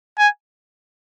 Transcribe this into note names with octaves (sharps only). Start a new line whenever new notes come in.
G#5